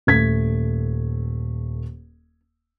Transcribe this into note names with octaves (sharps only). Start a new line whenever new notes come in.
D#1 A3 G#6 B6